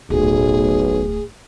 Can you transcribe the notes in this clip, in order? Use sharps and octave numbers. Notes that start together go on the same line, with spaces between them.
D1 B1 A2 G#4